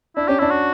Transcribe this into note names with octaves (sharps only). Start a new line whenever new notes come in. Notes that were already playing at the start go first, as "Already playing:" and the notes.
D4 E4
C#4 G4
D4 E4
F#4